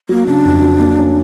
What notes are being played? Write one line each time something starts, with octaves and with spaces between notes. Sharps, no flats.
F#3 A#3
C#3 D4
F2
F#3
A#3
C#4